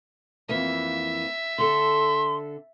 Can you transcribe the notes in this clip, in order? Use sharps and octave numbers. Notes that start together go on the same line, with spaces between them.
F2 E3 A#3 E5
D3 A4 C6